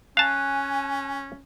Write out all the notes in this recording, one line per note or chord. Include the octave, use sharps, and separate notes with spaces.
C#4 F5 G#5 A5 F#6